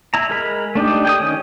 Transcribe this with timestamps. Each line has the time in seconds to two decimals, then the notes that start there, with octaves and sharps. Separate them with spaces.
0.14 E4 A#5
0.30 G#3 A#4 B5
0.75 A3 D4 D#4 G4
1.05 G5 G#5 D#6
1.20 D#3 C#4